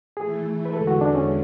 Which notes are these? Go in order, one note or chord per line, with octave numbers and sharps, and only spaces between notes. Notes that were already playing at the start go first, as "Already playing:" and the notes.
E3 A3 E4 G#4
B4
E2 D3 G#3 A4
F#4
D4
C#4